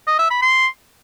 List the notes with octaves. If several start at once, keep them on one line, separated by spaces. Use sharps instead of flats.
D#5
E5
B5
C6